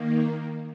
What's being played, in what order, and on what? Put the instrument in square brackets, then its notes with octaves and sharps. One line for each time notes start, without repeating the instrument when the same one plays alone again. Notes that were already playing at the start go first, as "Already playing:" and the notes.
Already playing: [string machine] D#3 A#3